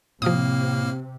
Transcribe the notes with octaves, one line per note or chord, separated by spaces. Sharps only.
A2 C3 F3 A#3 D#6 F6